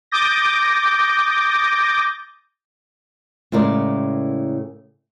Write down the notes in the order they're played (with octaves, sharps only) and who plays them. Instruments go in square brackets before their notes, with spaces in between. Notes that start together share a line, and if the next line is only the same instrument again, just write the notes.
[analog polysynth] D6 D#6 G6 A6 A#6
[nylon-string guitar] A2 C#3 G#3 A#4 D5